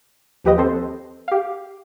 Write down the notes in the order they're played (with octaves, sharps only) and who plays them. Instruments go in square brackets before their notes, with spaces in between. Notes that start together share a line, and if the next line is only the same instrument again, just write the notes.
[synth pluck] D#2 F3 G4 B4 D#5 D#6
C4 A4 C5
G4 F5